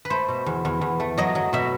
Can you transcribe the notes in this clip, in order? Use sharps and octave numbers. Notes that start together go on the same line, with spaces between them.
B4
A3 C5
B2
E2
E2
E2
A3
F#3 D#5
F#3
B2 E5